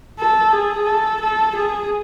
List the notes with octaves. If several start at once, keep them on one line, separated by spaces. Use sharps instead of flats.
A4
G#4
A4
A4
G#4